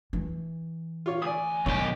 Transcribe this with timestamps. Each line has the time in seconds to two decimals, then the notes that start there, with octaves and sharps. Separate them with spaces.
0.13 E3
1.06 F4 C#5
1.22 D2 D5 G#5 D#6
1.66 B1 D#3 G4 C#5